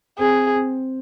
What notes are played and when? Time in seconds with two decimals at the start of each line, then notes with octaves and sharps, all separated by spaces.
0.19 C4 G#4
0.54 C4